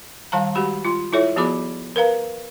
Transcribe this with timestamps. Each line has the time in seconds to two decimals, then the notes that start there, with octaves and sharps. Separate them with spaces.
0.32 D#3 G3 F5 A5 A#5
0.55 G#3 F#4 G4 B5
0.85 F4 C6
1.13 E4 F4 A4 C#5 E5
1.36 F3 B3 F#4 G#4 B5 D6
1.96 A#4 B4 F5 A#5